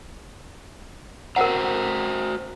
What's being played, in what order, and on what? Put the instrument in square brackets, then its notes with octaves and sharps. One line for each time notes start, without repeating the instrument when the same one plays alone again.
[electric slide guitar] F#4 C5 A#5 [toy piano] A#4 F#5